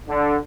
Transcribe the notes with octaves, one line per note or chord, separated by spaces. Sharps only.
D3